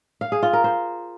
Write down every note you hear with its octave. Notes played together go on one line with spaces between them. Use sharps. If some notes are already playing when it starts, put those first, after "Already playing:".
F5
G#4
F4
A#4
C5